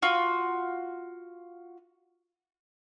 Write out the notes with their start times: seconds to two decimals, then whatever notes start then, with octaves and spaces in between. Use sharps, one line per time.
0.02 F4 F#4